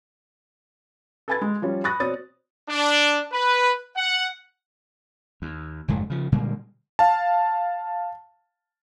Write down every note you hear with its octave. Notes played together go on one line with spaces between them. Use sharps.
A4 B4 G#5 B5 G#6 A6
G#3
F3 G3 C#4
B5 C#6 D#6 F#6 A6 A#6
B2 C4 C#5 D5 D#6 A6
D4
B4
F#5
D#2
F#1 F2 G#2 A3
C#3 F3
A#2 D3 G3 G#3
F5 A5